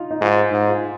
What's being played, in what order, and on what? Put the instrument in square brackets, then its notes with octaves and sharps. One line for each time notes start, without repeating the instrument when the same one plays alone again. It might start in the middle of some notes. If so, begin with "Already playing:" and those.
Already playing: [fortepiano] D#4 F4
D#4
[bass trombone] G#2 [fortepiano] F4
[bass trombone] G#2
[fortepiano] F4